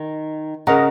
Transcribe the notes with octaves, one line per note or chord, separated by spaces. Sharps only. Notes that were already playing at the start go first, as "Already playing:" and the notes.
Already playing: D#3
C#3 A#4 D#5 F#5 A#5